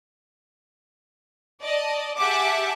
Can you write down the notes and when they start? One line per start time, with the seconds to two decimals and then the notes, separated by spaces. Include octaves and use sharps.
1.61 D5 D#5 A5
2.17 G4 G#4 E5 F#5 A5 D6